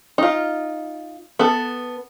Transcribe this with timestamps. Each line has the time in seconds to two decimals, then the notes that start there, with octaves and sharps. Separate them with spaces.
0.18 D#4 F4
1.39 B3 A4